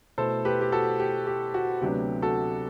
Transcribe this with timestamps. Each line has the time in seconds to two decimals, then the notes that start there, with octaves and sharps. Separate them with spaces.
0.18 B2 A3 E4 A4 C5
0.45 G4 B4
0.61 G4
0.72 F#4 A4
1.00 G4
1.27 G4
1.54 F#4
1.81 D2 C3 F#3 B3 D4 G4
2.22 F#4 A4